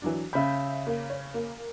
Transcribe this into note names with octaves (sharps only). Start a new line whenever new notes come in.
E3 F#3 D4
C#3 E5 B5 G6
A#3
C#5
A#3